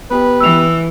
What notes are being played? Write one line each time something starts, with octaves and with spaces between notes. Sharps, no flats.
B3 G4 B4
E3 E6 F7